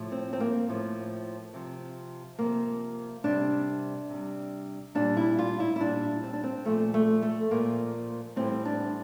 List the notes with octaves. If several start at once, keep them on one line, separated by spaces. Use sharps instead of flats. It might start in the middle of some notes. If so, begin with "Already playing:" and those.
Already playing: A2 F3
C4
C4
A#3
A2 F3
C3 F3
C3 F3 A#3
C3 G3 D4
C3 G3
A#2 G3 D4
E4
F4
E4
E4
A#2 G3 D4
C4
D4
C4
A#2 F3 A3
A3
A3
A#2 F3 A#3
A2 E3 G3 C4
D4